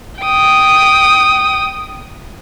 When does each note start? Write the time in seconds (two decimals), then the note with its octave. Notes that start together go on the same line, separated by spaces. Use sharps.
0.21 G5 D#6